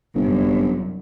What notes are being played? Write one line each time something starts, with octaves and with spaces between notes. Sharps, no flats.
G1 C2 F#2